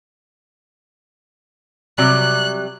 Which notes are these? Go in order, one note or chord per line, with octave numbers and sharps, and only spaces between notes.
C3 F#3 G3 F#6